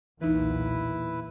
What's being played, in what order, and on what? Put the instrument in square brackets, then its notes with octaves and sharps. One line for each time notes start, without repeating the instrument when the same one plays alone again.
[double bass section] B1 E2 A#2 [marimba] E3 D#4 [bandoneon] E4 B4